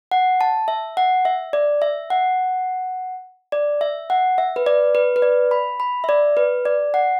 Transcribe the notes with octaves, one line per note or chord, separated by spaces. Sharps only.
F#5
A5
E5
F#5
E5
D5
E5
F#5
D5
E5
F#5
E5
B4
D5
B4
B4
D5
B5
B5
E5
D5
B4
D5
F#5